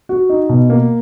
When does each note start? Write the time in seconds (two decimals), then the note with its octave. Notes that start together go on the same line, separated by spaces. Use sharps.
0.09 F#4
0.30 D#4
0.49 B2
0.70 A#3